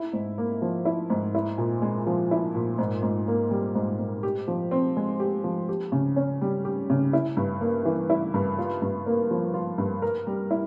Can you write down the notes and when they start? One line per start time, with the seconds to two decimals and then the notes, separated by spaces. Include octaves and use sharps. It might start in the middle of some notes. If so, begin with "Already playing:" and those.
Already playing: E4
0.13 G#2
0.38 A#3
0.62 F3
0.85 E4
1.10 G#2
1.35 E4
1.58 A#2
1.82 G#3
2.07 F3
2.31 E4
2.55 A#2
2.78 G#2
3.03 G#2
3.28 A#3
3.51 G3
3.75 G#2
3.99 G#2
4.23 G4
4.48 F3
4.71 C4
4.97 G#3
5.20 G4
5.44 F3
5.69 G4
5.92 C#3
6.16 C#4
6.41 G3
6.65 G4
6.90 C#3
7.13 E4
7.37 G2
7.61 A#3
7.85 E3
8.10 E4
8.34 G2
8.58 F4
8.82 G2
9.06 A#3
9.31 F3
9.54 F4
9.78 G2
10.02 A#4
10.27 G3
10.51 E4